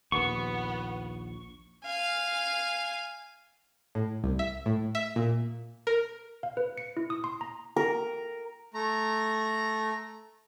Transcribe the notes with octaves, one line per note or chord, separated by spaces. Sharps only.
A#1 D#2 B3 C#6
F5 G#5
A2
C2
E5
A2
E5
A#2
A#4
F5
B4
C#7
E4
D#6
C6
A#5
A#4
A3 A#5